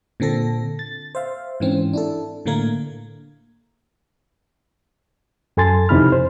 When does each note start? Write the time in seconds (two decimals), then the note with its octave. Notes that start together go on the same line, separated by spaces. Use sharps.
0.20 A#2 D3 C4 A4 A#6
0.79 A6
1.15 C5 E5 F5
1.60 G#2 E3 C4 C#4
1.93 D4 E4 A4
2.46 A2 D3 A3 A#3 A#4 G#6
5.57 F#2 A4 G#5 C6 A6
5.89 F2 C3 D#4 E4 B5 F6
6.12 C5